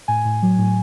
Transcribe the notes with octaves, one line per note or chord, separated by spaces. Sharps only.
A2 G#5
A2
F#3
A2